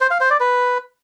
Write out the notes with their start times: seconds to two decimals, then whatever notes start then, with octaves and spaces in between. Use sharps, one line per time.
0.01 C5
0.11 F5
0.20 C5
0.30 D5
0.40 B4